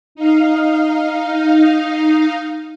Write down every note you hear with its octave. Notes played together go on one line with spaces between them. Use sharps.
D#4 F5